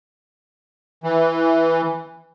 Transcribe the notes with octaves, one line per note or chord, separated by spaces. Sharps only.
E3